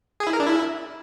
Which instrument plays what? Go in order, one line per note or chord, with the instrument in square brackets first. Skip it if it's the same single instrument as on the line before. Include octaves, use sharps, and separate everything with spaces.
[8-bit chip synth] G#4
E4
A#4
D4
E4